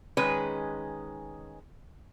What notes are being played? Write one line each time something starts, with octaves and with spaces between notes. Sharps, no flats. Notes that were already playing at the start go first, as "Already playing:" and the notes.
D#3 G#3 C#4 B4